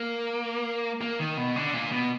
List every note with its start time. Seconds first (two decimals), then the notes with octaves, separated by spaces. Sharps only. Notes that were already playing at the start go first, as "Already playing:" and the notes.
Already playing: A#3
1.01 A#3
1.20 D#3
1.37 B2
1.56 D3
1.74 A#2
1.92 B2